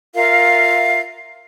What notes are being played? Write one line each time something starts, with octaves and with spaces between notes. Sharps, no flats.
F4 A#4 E5 F5